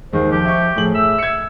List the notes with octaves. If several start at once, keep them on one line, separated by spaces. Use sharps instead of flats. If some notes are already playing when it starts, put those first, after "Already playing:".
D#2 D#3 G#3 C5
F3 G4
E5 C#6
A2 F3 G#4 F#7
E5 E6
G#6 C#7